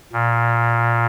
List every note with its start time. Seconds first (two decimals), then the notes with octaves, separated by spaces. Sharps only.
0.13 A#2